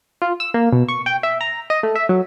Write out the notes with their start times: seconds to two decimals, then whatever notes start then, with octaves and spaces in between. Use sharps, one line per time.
0.22 F4
0.40 E6
0.54 A#3
0.72 B2
0.88 C#6
1.06 G5
1.23 E5
1.41 A#5
1.70 D#5
1.83 A3
1.95 E5
2.09 F#3